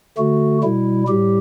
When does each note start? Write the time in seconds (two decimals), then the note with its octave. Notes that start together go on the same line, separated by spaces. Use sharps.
0.18 D3 A3 F#4
0.63 B2 G3 E4
1.07 A2 G3 G4